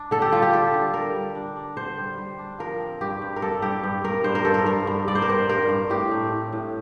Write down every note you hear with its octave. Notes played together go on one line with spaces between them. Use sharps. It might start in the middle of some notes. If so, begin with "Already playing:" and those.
Already playing: D4
D3 A4
G4
G3 F4
G4
D3 A4
D3
G3 A#4
G3
D4
D4
D3 C5
G3
G3
D4
F3 A#4
C4
G2 G4
G2
A#4
G2 A4
G2 G4
G2
G2 A#4
G2 C5
A#4
G2 A4
A#4
G2 A#4
G2
G2 D5
C5
A#4
C4 C5
G2 A#4
G2
A2 G4
A3
A2
A2